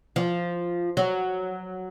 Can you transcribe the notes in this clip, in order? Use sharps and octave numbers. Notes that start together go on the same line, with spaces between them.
F3
F#3